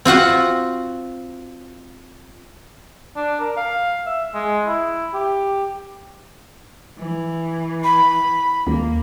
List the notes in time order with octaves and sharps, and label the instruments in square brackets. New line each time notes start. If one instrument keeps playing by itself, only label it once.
[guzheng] C4 F4 F#4 F#5
[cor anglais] D4
A#4
F5
E5
G#3
E4
G4
[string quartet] E3
[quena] B5
[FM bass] D#2 [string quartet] A#3